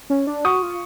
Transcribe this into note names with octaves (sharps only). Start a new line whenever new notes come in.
C#4
D4
F#4 C#6 D#6
F4